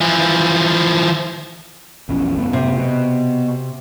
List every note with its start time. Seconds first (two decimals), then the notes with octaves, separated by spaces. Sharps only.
0.01 E3 F3
2.09 A#1 E2 C#4
2.37 F#1 A3 B3
2.53 C3
2.78 B2